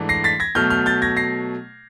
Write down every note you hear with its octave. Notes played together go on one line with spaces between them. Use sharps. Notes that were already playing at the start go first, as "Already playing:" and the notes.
Already playing: G#2 E3 A3 D4
A#6 C7
A6 B6
G#6 A#6
B2 F#3 A3 F6 G6
F6 G6
G6 A6
G#6 A#6
A#6 C7